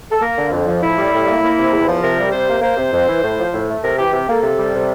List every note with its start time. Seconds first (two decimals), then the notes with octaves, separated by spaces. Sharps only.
0.11 A4
0.20 A#3 A#4
0.37 D3
0.51 F2
0.67 F3
0.81 A2 E4
0.96 G3
1.12 A2
1.26 A#3
1.42 A#3
1.57 C3
1.71 E2
1.88 F3
2.02 C3 A#4
2.17 G3
2.32 C3 C5
2.48 A#3
2.62 A#3 C5
2.77 C3
2.92 F2
3.08 E3
3.22 A2
3.38 F3
3.52 A2
3.69 A3
3.83 C3 A#4
3.97 E3 G4
4.13 C3 G4
4.28 A#3 A4
4.43 C3
4.58 G3
4.73 C3